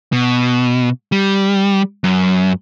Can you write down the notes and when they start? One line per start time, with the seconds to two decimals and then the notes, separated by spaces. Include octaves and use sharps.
0.12 B2
1.12 G3
2.04 F#2